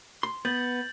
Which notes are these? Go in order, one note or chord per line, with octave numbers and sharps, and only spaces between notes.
C6
B3 G6 A6 F#7